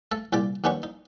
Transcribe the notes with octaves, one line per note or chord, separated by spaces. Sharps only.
A3 A4
C2 A#2 G4 D5 D6
D#2 B3 C#4 D4 G4 C#6
D#4